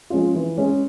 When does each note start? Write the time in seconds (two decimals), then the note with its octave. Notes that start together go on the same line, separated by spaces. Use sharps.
0.10 F3 G#3 C#4 F4
0.34 E3
0.58 G#3 C#4